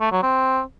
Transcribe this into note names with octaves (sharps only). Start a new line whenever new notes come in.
A3
F#3
C4